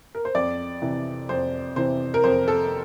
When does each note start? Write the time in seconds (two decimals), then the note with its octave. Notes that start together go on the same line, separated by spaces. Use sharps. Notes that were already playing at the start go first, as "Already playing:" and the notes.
0.15 A#4
0.25 C5
0.35 F2 D5
0.82 C3 E3
1.29 F2 C5
1.76 C3 E3 C5
2.14 A#4
2.24 F2 C5
2.48 A4